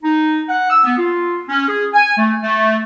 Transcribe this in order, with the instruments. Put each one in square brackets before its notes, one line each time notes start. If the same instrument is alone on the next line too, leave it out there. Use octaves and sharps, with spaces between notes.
[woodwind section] D#4
F#5
E6
B3
F4
C#4
G#4
G#5
A3
A3